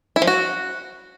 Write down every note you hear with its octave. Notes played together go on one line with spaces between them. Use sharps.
E4
F3
F#4